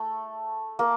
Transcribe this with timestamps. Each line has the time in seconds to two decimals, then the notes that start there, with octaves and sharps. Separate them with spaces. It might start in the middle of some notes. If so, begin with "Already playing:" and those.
Already playing: A3
0.79 A#3